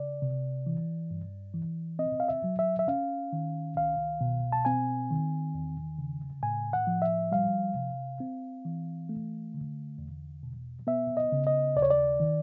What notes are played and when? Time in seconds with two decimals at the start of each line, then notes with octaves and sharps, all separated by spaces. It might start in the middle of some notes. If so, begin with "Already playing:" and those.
Already playing: C#3 D5
0.22 C3
0.66 E3
1.11 G2
1.54 E3
1.99 C4 D#5
2.20 F5
2.29 E5
2.44 F#3
2.59 E5
2.79 E5
2.88 C#4 F5
3.33 D#3
3.76 C2 F5
4.21 B2
4.52 A5
4.65 C4 G#5
5.11 D#3
5.54 E2
5.98 C#3
6.43 A2 G#5
6.73 F#5
6.87 F3
7.02 E5
7.32 G3 F5
7.76 C3
8.20 C4
8.65 E3
9.09 A3
9.54 D3
9.98 E2
10.43 B2
10.87 B3 E5
11.17 D#5
11.32 C#3
11.47 D#5
11.76 D#2 D5
11.82 C#5
11.90 D5
12.20 D#3